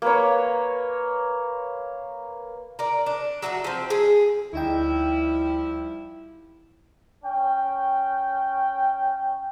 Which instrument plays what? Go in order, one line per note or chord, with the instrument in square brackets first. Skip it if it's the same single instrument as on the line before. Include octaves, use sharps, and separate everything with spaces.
[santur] A#3 B4 C#5
[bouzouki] A#4 D5
D4
F#3 F#4 D#5 E5
F3 C4
G#4
[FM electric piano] D2 D#4 G5 [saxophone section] F3 G3 E4
[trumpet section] C#4 G5